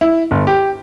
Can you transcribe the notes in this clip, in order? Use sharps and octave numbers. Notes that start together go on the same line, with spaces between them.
E4
G1
G4